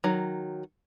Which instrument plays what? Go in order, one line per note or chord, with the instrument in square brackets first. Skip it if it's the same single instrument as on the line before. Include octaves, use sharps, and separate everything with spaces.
[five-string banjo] D#3 F#3